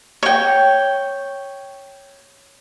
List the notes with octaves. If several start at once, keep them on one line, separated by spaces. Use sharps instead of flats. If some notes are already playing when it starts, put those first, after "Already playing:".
C#5 G5